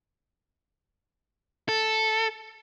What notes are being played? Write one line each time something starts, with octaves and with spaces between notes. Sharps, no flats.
A4